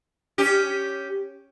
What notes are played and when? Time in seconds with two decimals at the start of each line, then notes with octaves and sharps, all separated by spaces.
0.38 C#4 G4